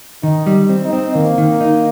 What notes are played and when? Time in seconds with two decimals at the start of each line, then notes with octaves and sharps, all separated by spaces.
0.23 D#3 D#4
0.47 G3
0.69 C4
0.85 D#4
0.93 C4
1.15 D#3 A#3
1.38 D#3
1.61 D#4